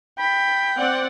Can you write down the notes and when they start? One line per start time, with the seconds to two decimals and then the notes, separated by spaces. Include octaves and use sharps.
0.19 G5 B5
0.76 C4 D5 F#5